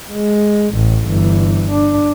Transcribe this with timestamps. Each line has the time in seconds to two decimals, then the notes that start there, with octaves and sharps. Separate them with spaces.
0.12 G#3
0.75 A1
1.06 G1 E3
1.72 D4